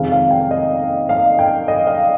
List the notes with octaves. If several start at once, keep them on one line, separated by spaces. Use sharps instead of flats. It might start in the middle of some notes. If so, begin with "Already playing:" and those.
Already playing: F2 C3 D#3 G#3 F5
F5
G5
D#5
F5
G5
D#5
F5